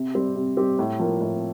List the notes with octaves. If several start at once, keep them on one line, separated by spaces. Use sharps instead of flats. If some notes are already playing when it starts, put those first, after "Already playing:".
Already playing: C3
G3 C4 G4
C3
G3 C4 G4
A2
F3 A#3
A2